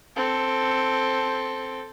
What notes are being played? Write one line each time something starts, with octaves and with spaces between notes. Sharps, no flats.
C4 A4